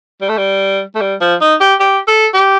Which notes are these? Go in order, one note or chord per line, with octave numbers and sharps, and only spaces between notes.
G3
A3
G3
A3
G3
F3
D#4
G4
G4
A4
G4